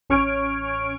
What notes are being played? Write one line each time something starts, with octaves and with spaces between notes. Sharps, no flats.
A1 C#4 C#6 F6 G#6 D7